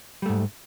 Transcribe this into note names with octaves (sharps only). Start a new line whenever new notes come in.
G#2 G3 A3